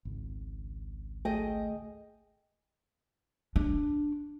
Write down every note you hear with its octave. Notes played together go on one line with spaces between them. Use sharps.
G#1 C#2
A3 G#4 D#5 G5
D4